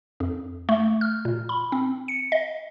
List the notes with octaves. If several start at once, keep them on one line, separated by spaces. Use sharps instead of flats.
F2
A3
F6
A#2
B5
C4
C#7
D#5